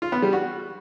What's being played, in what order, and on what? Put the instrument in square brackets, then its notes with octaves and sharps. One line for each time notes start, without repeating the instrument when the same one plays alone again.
[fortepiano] F4
B3
G3
F#4